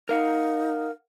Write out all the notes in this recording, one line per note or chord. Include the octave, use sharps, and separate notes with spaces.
D#4 A#4 F5 F#5